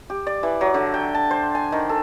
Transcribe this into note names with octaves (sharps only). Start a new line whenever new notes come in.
G4
D5
E3
F#3
D3
G5
A5
C5
G#5
D#3
A4